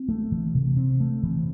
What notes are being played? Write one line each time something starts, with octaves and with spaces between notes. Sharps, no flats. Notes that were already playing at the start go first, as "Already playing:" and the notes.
Already playing: C4
A3
E3
C3
C4
A3
E3